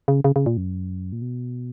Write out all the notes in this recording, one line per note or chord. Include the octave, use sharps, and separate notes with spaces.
C#3
C#3
C#3
A#2
F#2
A#2
B2